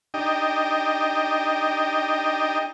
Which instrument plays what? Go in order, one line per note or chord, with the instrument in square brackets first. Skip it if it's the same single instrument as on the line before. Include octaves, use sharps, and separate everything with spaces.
[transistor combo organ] D4 D#4 G4 D#5 G5